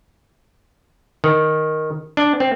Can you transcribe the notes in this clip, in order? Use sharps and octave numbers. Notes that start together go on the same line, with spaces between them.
D#3
D4
C4